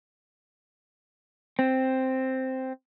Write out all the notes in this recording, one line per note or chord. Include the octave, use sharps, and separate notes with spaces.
C4